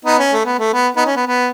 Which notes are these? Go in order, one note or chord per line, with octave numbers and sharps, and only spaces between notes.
B3 D#4
C#4
A3
B3
A3
B3
B3 D#4
C#4
B3
B3